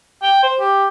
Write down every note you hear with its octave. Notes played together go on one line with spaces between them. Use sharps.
G5
C5
G4